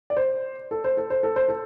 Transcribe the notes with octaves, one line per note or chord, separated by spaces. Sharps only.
D5
C5
A4
C5
A4
C5
A4
C5
A4